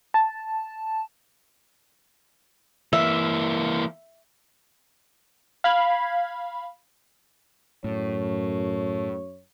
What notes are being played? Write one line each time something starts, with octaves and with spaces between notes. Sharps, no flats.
A5
E3 A#3 E5
F5 B5 G#6
F#2 A2 C#5